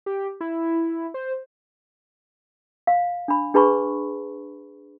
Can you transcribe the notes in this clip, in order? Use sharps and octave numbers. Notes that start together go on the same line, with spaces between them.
G4
E4
C5
F5
D4 B5
D4 G#4 B4 A5 B5 C#6